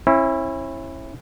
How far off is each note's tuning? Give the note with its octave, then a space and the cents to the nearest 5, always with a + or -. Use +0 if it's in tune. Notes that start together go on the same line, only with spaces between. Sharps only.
C#4 -40 E4 +0